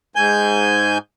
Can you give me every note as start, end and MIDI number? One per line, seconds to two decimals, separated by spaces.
0.16 0.98 44
0.16 0.98 80
0.16 0.98 91